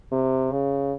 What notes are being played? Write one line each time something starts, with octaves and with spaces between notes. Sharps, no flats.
C3
C#3